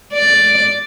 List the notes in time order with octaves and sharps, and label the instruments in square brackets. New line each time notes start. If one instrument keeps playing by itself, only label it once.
[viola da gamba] D5